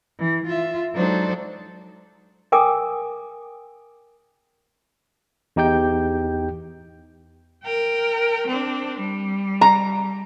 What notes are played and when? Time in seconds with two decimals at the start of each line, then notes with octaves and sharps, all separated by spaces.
0.16 E3
0.46 F4 E5
0.93 F#3 G#3 D4 D#4 A4 C5
2.52 G#4 A#4 G5 G#5 D6 D#6
5.56 E2 D#4 G4 G5 G6
7.64 A#4 G5
8.47 C4 D4
9.00 G3
9.61 A#5